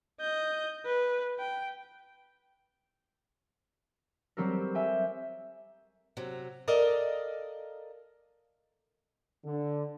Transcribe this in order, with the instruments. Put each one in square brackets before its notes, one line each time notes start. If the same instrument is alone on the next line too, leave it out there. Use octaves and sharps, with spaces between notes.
[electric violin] D#5 G6
B4
G5
[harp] F#3 G3 C4 G4 A4 A#4
E5 G5 G#5
[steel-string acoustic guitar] C3 F#3
A4 A#4 D5 D#5 F5
[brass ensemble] D3